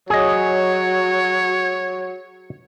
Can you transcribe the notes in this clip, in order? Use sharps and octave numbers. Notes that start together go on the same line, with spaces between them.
F#3 G#4 C#5 D#5